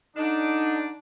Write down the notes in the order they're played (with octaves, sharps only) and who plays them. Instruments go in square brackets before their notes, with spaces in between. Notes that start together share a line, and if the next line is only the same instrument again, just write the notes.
[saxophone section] D3 D#4 [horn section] D4